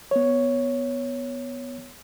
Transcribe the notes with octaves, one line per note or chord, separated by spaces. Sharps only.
B3 C#5